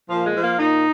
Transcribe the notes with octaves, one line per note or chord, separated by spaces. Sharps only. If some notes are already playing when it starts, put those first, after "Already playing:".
A#2 F3
G#3
F3
A#3
A#2 D#4